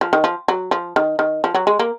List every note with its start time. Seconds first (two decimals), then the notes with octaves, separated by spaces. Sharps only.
0.01 F3
0.13 D#3
0.24 F3
0.48 F#3
0.71 F3
0.96 D#3
1.19 D#3
1.44 F3
1.54 F#3
1.67 G#3
1.79 A#3